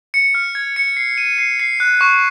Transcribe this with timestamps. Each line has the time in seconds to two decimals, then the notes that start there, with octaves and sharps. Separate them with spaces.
0.14 C#7
0.35 F6
0.55 G#6
0.76 C#7
0.97 C7
1.18 D#7
1.38 C7
1.60 C7
1.80 F#6
2.01 C#6